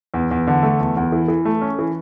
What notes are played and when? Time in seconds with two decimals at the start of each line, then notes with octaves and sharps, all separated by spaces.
0.14 E2
0.31 E2
0.47 D3
0.63 A3
0.80 E2
0.97 E2
1.12 E3
1.28 E3
1.45 A3
1.62 C#4
1.79 E3